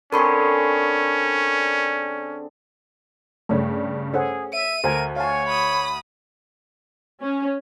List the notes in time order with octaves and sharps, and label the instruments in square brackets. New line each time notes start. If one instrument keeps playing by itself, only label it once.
[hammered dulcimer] D3 C4 G#4 [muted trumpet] C#4 [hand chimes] A#4 B5 C#6
[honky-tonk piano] G2 C#3 G3 [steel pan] A3 C#5
[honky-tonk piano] C#4 [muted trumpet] G#4 [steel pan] A4 C5 F#5
[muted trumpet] E5 [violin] D#7
[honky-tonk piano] D2 [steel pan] A4 C5 G#5 [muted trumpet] A#4
[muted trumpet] C#5 [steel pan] F5 A5 [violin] G#5
[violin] B5 D#6
[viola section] C#4